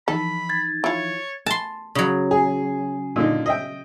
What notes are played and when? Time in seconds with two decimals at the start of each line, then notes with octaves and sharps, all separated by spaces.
0.08 E3 F3 D#4 A4 B5
0.49 G#6 A6
0.84 E4 F4 C#5
1.46 A5 C6
1.95 C#3 F#3
2.31 G#4
3.16 A#2 D3 D#4
3.46 D#5 E5 G5